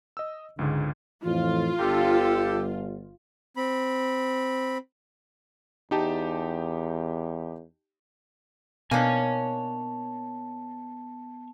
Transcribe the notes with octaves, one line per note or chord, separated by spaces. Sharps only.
D#5 E6
C#2 G#2 D3
F2 A2 E3 F4
G1 G4 A4
C4 B5
E2 D#4 G4 A5
B2 A#3 B3 D4 D#4 C#5 G#5 A5